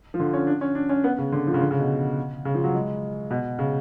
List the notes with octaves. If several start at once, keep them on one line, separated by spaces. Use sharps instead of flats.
F3
D3
C#4
D4
C#4
D4
C#4
B3
C#3
D3
F3
C#3
D3
C#3
B2
C#3
F3
F#3
G#3
B2
C#3